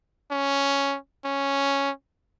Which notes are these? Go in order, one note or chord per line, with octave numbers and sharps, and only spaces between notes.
C#4
C#4